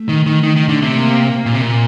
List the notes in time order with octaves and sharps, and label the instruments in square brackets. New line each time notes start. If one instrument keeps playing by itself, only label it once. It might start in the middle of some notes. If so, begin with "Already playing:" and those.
Already playing: [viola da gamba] A3
[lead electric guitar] D#3
D#3
D#3
D#3
D3
C3
[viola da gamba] A#3
[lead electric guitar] A#2
C3
A#2